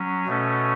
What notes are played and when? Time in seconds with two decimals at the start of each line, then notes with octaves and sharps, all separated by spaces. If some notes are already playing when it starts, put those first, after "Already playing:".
Already playing: F#3 C#4
0.26 B2 A3 C#4